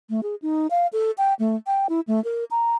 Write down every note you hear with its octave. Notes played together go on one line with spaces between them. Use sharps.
A3
G#4
D#4
F5
A4
G5
A3
G5
E4
A3
A#4
A#5